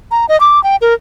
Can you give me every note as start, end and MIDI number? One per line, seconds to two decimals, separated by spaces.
0.11 0.26 82
0.29 0.39 75
0.40 0.62 86
0.64 0.76 79
0.82 0.94 70